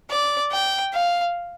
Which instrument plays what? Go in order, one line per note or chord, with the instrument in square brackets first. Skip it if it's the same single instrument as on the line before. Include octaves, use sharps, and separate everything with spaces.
[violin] D5
G5
F5